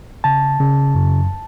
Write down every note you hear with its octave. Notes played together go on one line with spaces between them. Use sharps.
C#3 A5
C#3
F#2